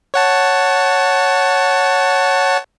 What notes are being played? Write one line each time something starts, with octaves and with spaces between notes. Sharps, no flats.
C#5 F#5 A5